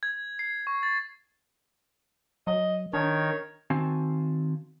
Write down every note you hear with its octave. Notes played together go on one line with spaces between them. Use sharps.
G#6
C7
C#6
A6
F#3 D#5
D#3 D4 C#5
D#3 C4 F#4 F5 G#5 A5